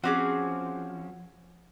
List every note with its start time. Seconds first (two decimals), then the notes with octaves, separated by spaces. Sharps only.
0.04 F3 C4 C#4 F#4 G#4 D6 D#6